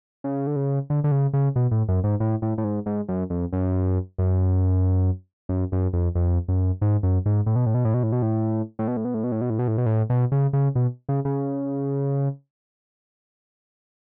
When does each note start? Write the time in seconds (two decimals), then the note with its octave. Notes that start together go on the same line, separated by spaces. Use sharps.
0.24 C#3
0.47 D3
0.56 C#3
0.90 D3
1.04 D3
1.12 C#3
1.33 C#3
1.56 B2
1.71 A2
1.88 F#2
2.04 G#2
2.20 A2
2.42 A2
2.58 A2
2.64 G#2
2.86 G#2
3.08 F#2
3.30 F2
3.53 F#2
4.18 F#2
5.49 F#2
5.72 F#2
5.93 F2
6.15 F2
6.48 F#2
6.81 G#2
7.03 F#2
7.26 G#2
7.46 A2
7.56 B2
7.66 A2
7.74 B2
7.85 A2
7.94 B2
8.03 A2
8.12 B2
8.22 A2
8.79 A2
8.88 B2
8.97 A2
9.05 B2
9.14 A2
9.24 B2
9.32 A2
9.41 B2
9.50 A2
9.59 B2
9.68 A2
9.78 B2
9.86 A2
10.10 B2
10.32 C#3
10.53 C#3
10.75 B2
11.09 C#3
11.25 C#3